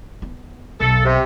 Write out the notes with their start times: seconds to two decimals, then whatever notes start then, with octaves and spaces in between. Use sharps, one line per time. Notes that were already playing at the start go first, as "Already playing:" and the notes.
0.22 B3
0.80 B1 A4
1.05 C3